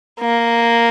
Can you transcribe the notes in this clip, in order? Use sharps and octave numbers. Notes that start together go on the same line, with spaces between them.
A#3